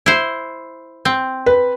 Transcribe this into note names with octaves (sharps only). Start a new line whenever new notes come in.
E4 C5
C4
B4